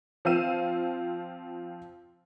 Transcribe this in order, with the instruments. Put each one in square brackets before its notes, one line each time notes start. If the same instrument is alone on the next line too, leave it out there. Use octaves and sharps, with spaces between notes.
[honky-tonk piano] F3 C4 F5 E6 D#7 E7